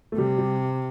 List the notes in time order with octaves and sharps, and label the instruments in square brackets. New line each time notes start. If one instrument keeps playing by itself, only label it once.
[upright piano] A3
[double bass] C3 [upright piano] G3
[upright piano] G3